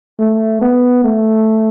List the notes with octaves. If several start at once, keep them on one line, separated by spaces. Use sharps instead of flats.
A3
B3
A3